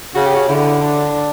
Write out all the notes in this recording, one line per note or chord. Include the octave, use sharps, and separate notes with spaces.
C#3 F#4
G4
F#4
D3 E4
D4